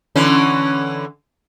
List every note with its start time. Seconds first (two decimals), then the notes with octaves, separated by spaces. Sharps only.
0.16 D3 E3 C#4